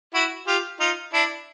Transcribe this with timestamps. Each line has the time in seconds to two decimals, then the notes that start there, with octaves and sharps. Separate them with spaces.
0.14 E4 F#4
0.47 F4 G4
0.80 D#4 F4
1.13 D4 E4